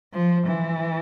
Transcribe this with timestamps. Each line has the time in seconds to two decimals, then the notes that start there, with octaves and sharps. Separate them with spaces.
0.14 F3
0.47 E3